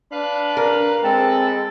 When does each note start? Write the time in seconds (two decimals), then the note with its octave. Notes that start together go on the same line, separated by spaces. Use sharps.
0.12 D4 B4 F5 F#6
0.57 A#4
1.03 G#3 C4 A4 A5 B5